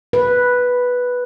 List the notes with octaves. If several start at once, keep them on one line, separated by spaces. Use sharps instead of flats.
B4